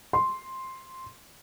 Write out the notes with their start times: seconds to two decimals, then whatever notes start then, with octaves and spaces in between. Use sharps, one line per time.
0.13 C6